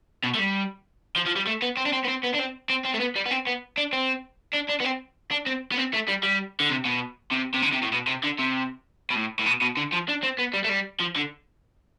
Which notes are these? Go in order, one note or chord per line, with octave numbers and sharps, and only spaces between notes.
B2
A3
G3
F3
F3
G3
A3
B3
C4
D4
C4
B3
C4
B3
D4
C4
C4
C4
A3
B3
G3
B3
C4
B3
D4
C4
D4
D4
B3
C4
D4
C4
B3
C4
A3
G3
G3
D3
C3
B2
C3
C3
D3
C3
A2
B2
C3
D3
C3
B2
A2
A2
B2
B2
D3
F3
D4
C4
B3
G3
A3
G3
F3
D3